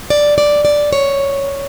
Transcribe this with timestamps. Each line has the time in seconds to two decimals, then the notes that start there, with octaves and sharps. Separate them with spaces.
0.10 D5
0.38 D5
0.65 D5
0.93 C#5